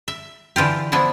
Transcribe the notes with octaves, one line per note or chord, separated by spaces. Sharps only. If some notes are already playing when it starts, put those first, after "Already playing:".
E5
D3 E3 F4 G4
F3 B3 D4 E4